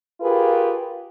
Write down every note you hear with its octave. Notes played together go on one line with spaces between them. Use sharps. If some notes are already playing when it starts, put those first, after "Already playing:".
F4 G4 G#4 A#4 B4